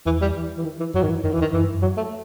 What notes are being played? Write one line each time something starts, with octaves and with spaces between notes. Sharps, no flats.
E2 E3
G3
E3
E3
D#3
E3
F#2 F#3
G2 D#3
E3
F#2 D#3
E3
E2
D#3
F#2 E3
G2
F#2
F#3
A3